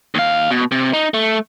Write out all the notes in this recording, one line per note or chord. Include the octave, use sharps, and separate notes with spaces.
D#2 F5
B2
C3
D#4
A3